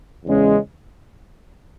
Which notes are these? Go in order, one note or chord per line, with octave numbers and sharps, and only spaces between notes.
E2 C#3 G#3 C#4